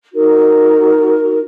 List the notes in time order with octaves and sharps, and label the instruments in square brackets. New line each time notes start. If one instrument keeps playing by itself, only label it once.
[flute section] D#4 F#4 A#4